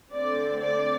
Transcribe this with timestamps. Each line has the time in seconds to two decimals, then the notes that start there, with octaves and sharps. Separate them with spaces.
0.12 D3 A3 C4 D5
0.60 D5